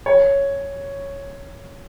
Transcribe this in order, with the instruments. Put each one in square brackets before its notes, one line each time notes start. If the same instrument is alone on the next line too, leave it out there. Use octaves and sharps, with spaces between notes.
[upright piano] C#5